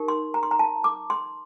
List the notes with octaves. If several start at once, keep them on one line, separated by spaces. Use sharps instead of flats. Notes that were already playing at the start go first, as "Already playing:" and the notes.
Already playing: D#4 G4 A#4
C6
A#5
C6
A#5
A5
D6
C6